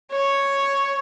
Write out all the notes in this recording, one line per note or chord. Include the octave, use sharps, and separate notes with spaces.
C#5